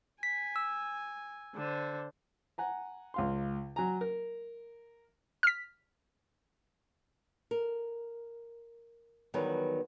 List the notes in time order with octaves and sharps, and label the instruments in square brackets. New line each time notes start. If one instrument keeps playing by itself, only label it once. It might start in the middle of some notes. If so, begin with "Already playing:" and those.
[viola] G#5 [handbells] B6
[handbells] E6
[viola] D3 C5
[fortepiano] F#5 G#5 A#5
C#2 F5 C6
F#3 G#5 A#5
A#4
[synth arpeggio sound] F6 B6
[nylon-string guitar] A#4
E2 D#3 F#3 G3 B4 G#5